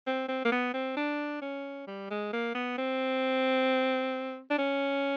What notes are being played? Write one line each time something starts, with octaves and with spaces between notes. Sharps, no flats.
C4
C4
A#3
B3
C4
D4
C#4
G3
G#3
A#3
B3
C4
D4
C#4